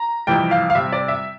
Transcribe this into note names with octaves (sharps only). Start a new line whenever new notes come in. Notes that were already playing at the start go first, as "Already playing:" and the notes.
Already playing: A#5
F2 C3 E3 G3 G5
F5
F5
C3 G3 C4 E5
D5
E5